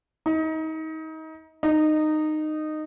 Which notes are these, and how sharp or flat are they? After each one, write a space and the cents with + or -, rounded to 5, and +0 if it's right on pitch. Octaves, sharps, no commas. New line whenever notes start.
D#4 +30
D#4 -15